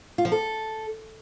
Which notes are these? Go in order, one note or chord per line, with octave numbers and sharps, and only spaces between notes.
F4
F3
A4